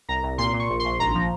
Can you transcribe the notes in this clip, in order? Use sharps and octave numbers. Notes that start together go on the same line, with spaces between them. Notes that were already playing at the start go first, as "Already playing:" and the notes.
C2 A#5
C2
A#2 C6
A#2
C#6
A#1
A#1 C6
G#1 A#5
F3